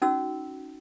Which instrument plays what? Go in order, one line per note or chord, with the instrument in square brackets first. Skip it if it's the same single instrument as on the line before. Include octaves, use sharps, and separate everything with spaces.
[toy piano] C#4 D#4 F#4 E6